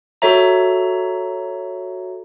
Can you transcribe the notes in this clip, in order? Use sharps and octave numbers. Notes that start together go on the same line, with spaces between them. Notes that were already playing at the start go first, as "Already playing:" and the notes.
F#4 A4 C#5 E5 A#5